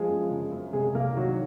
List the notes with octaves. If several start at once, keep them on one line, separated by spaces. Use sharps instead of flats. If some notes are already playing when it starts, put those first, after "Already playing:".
Already playing: F3 G#3 G#4
F#2
C#3
F#2
C3 G#3 G#4
C2 A#3 A#4
D#3 F#3 F#4